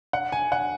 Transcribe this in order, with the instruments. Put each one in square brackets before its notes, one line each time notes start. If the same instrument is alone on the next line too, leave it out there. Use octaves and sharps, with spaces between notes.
[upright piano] F#5
G#5
F#5